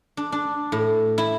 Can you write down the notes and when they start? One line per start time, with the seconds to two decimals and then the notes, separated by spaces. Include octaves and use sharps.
0.17 D4
0.32 D4
0.72 A2
1.18 E4